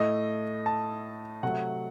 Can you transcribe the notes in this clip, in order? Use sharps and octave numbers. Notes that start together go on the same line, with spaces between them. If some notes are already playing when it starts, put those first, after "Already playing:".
Already playing: A2 A3 D#5
A5
C3 F#3 A3 F#5